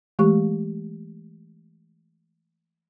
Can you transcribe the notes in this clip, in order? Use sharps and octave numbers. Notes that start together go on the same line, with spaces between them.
E3 G#3 A3 G4 C#6